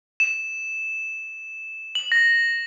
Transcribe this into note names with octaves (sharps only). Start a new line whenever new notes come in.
E7
F#7
A#6